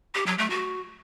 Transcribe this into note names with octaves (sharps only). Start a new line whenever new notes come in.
G4
F#3
A3
F#4